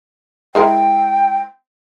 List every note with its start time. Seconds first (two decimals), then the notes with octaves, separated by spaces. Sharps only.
0.55 G#3 E4 A#4 G5